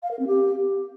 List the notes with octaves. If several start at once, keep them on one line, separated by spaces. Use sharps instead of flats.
F5
A#4
C4
G4